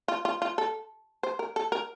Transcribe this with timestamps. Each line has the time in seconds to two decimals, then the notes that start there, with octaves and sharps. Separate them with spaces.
0.08 F4
0.25 F4
0.42 F4
0.58 A4
1.23 C5
1.39 A#4
1.56 A4
1.72 A#4